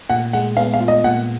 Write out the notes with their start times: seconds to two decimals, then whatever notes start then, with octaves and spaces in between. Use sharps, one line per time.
0.10 A#2 F#5
0.33 G#3 F#5
0.57 B3 F5
0.74 F5
0.81 F4
0.88 D#5
1.04 A#2 F#5